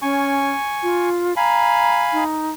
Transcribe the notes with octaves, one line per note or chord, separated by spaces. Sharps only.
C#4 G#5 C#6
F4
F5 G#5 A#5 B5
D#4